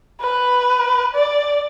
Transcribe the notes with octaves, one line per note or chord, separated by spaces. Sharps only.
B4
D5